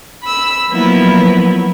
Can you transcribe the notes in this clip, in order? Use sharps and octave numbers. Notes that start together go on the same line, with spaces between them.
B5 E6
F3 F#3 A#3 B3 E4